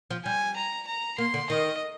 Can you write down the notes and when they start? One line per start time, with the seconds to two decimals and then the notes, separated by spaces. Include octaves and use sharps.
0.11 F3
0.25 G3 G#5
0.57 A#5
0.87 A#5
1.18 A#3 C6
1.34 D3
1.50 D#3 D#5